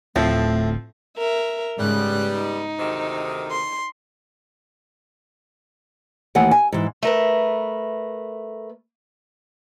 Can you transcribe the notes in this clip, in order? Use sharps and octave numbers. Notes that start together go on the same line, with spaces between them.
D1 A2 F3 A3 C4
A#4 E5
G#2 C#3 G3 B3 F#6
D#4
D2 C3 D#3
C6
D#2 E3 A3 F#5 G#5
G#5
G#2 E3
A3 A#4 B4